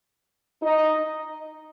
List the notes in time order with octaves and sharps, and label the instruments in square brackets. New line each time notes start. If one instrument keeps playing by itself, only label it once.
[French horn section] D#4 D#5